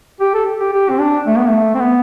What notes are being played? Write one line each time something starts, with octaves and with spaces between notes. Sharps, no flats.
G4
A4
G4
G4
C4
D4
A3
B3
A3
C4
B3